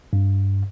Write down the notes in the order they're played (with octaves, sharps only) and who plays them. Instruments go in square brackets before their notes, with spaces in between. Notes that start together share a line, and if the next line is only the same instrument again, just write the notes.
[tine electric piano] G2